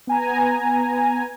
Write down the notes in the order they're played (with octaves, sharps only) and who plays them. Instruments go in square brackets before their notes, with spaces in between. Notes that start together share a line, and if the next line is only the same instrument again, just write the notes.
[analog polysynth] B3 G#5 A#5